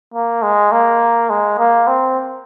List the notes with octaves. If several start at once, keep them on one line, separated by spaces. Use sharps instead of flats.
A#3
G#3
A#3
G#3
A#3
C4